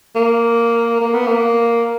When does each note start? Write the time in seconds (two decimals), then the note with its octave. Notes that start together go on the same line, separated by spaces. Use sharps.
0.16 A#3
1.00 A#3
1.14 B3
1.26 A#3